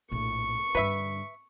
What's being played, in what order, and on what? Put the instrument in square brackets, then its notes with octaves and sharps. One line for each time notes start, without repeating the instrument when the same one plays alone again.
[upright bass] A#1 A2 [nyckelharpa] C#6
[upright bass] G2 D3 [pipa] B4 E5